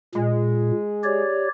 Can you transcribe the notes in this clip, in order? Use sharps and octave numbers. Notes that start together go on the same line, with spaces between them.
A#2 G#3
G4 C#5 D5